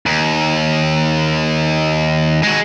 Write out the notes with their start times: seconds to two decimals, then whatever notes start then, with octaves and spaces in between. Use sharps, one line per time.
0.06 D#2
2.43 G#3 F#4